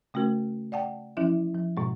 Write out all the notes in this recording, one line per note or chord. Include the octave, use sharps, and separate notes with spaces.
C#3 A3 C#4 F#4 A#4
D5 F#5 G5 A5
E3 F3 C#4 E4 E5
F3
G#2 B2 G#3